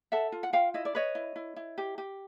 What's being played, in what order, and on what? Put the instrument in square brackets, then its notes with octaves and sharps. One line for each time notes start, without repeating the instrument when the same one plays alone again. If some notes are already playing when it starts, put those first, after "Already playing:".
[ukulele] A4 E5 F#5
F4
F#5
F4 F5 G5
E4 D#5
D5
B4 C#5 D#5
E4
E4
E4
G4
G4